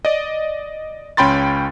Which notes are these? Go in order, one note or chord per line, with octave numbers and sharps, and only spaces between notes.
D5 D#5
C#2 C#4 G5 B5 C6 A6